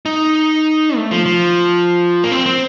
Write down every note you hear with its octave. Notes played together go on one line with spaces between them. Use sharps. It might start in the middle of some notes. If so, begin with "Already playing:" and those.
D#4
A3
F3
F3
A#3
C4
C4